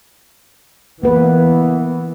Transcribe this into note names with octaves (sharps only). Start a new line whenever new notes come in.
E3 A#3 B3 B4